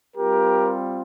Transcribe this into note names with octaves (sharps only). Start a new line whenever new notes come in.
G3 C4 F4 G4 A#4